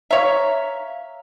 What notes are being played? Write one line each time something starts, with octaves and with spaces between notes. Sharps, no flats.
C#5 E5 F5 A#5